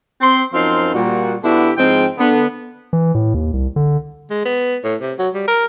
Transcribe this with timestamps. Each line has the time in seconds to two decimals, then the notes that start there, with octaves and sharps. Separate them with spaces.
0.21 C4 C6
0.53 F#2 F3 C4 D#4 F5 C6
0.94 A#2 G3 F#4
1.43 D3 B3 D4 E4 F#4 G4
1.77 G#2 F3 G#3 C4 F4 G5
2.18 D3 B3
2.93 E3
3.15 A2
3.34 D#2
3.53 C2
3.76 D3
4.30 G#3
4.45 B3
4.84 A2
5.01 C3
5.19 F#3
5.34 G3
5.48 A#4